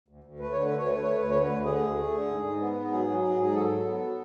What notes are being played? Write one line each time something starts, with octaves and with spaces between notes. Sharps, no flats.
D2
D2
A3 B4
D3 C#5
B4
D2
C#5
A3 B4
A3 C#5
D2 B4
C#5
D3
B4
D2
D3 G#4
D2
A3
D3
G#2
G#2
B3
G#2
F#3 G#4
F#3
G#2 G#4
G#2 G#4
F#3 A4
F#3
B3
F#3